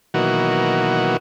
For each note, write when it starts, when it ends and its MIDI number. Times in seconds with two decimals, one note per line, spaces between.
0.14 1.17 47
0.14 1.17 51
0.14 1.17 52
0.14 1.17 54
0.14 1.17 58
0.14 1.17 66